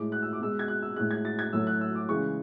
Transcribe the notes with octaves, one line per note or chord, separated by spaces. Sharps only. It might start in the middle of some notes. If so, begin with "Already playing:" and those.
Already playing: A2 G#3 D6
F#6
E6
D6
B2 G#3 E6
G#6
F#6
E6
A2 G#3 F#6
G#6
A6
G#6
A2 F#3 A3 E6
F#6
E6
D6
C#3 E3 G#3 C#6